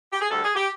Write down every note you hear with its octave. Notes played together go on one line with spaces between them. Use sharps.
G4
G#4
D2 D3 G3 A4
G#4
G4